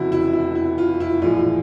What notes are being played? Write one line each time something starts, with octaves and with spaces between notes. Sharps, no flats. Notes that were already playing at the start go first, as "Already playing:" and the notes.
Already playing: F1 F2 C#3 E3 E4 F#4
E4
E4
E4
F4
E4
A#1 A2 E3 G#3 F4